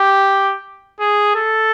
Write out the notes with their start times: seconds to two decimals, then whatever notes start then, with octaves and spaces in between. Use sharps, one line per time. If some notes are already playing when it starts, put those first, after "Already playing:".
Already playing: G4
1.00 G#4
1.36 A4